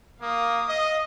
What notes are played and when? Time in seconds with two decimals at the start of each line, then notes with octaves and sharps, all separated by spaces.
0.22 A#3 F5 D#6
0.69 D#5